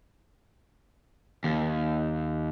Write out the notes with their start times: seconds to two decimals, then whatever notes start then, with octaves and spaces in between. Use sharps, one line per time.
1.44 D#2